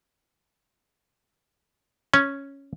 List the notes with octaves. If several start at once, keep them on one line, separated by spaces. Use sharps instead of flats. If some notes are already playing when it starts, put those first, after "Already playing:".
C#4